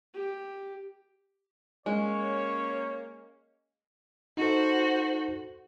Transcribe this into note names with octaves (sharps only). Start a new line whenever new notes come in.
G4
G#3 A#3 C#4 C#5
D#4 F#4 A4 C5